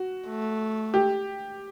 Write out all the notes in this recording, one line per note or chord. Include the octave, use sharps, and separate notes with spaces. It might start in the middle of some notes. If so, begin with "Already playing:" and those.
Already playing: F#4
A3
G4